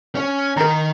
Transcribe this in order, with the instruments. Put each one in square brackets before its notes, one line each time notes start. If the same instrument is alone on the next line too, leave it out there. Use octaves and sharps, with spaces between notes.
[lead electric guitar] C#4 C#5
[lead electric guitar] D#3 [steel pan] A#4 A#5